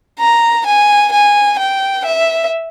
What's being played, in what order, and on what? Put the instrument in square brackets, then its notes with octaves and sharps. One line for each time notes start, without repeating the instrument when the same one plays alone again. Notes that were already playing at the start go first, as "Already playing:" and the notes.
[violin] A#5
G#5
G#5
G5
E5